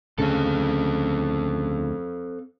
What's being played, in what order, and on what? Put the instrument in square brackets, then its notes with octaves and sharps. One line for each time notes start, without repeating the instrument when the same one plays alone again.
[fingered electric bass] D2 C#3 [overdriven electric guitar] C4 A4